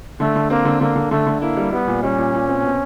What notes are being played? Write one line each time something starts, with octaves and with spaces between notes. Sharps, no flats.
D3 A3
D3
A#3 C4
D3
D3 A#3
D3
D3 A3
D3
A#3 E4
G3
G3 B3
A#2
G3 C#4
A#2
A#2
C4
B2